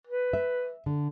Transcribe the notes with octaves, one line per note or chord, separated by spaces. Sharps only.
B4
E5
D3